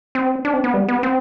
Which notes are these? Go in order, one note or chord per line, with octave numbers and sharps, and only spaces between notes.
C4
D4
C4
B3
G3
B3
C4